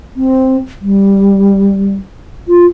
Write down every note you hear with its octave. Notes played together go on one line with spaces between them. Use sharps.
C4
G3
F4